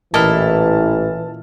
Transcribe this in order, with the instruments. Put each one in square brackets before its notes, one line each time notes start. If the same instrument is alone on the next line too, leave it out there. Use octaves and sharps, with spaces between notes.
[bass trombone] A1 [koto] A#2 E4 D#5 [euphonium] E3 [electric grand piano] A5 F6